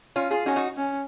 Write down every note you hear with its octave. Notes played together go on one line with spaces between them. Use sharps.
C#4 F4
F4 G#4
C#4 D#4 F#4
D#4 F#4
C#4